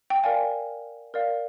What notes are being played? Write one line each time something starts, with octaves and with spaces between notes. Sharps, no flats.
G5
A#4 D5 F5 G#5
A#4 D5 F5